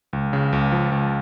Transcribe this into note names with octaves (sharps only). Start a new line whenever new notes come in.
C#2
C#3
C#2
F3
C#2